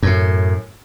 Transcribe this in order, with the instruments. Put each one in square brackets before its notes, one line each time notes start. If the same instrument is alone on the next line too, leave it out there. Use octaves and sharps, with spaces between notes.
[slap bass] F#2 A2